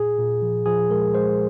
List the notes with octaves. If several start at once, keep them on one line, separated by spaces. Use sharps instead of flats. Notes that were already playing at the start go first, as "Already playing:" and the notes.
Already playing: A#2 G#4
A#2
F3
F3 G#4
G#3 A#4
G#3 C5